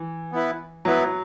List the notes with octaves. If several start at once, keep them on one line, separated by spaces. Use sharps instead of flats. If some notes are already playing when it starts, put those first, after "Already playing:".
Already playing: E3
B3 E4 B4
F#3 B3 E4 B4